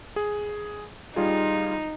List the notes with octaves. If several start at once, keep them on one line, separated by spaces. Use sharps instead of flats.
G#4
G3 D#4 F4 G#4